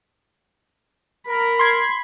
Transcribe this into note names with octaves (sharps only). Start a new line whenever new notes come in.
A#4 B5
C6 G#6 C7